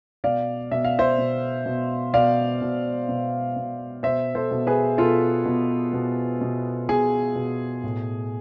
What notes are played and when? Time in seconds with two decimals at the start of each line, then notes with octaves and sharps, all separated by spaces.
0.24 B2 D5 F5
0.71 B2 E5
0.84 F5
0.99 C5 E5
1.18 B2
1.66 B2
2.14 B2 D5 F5
2.62 B2
3.09 B2
3.56 B2
4.03 B2 C5 E5
4.35 A4 C5
4.51 B2
4.67 G#4 B4
4.98 B2 F4 A4
5.46 B2
5.93 B2
6.41 B2
6.89 B2 G#4
7.36 B2
7.84 A2